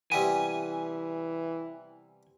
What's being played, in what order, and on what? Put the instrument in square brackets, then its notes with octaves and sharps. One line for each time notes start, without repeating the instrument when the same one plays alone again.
[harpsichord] C3 G3 B3 [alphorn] E3 [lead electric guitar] G#5